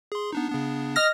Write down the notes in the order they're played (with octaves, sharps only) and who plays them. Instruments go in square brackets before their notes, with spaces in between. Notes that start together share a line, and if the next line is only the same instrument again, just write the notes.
[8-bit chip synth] G#4 C6
B3 D4 D#4
C#3 B3 D4
[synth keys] D#5 F6 A#6